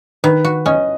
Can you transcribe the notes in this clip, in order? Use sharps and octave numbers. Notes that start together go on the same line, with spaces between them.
D#3 B4
F#4
C#4 D#5